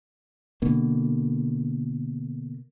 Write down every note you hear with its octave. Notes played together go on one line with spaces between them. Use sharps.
B2 D3 A#3